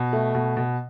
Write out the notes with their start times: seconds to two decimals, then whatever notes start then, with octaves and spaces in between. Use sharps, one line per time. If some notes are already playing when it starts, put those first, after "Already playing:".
Already playing: B2
0.13 A3
0.35 B2
0.57 B2